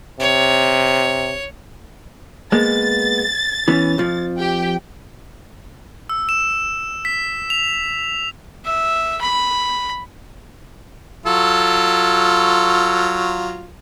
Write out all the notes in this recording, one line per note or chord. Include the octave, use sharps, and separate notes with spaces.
C3 C#5
G#3 A#3 B3 A6
E3 B3 C#4
F2 F3
G4 G5
E6
E7
B6
F7
E5
B5
F#3 F4 A4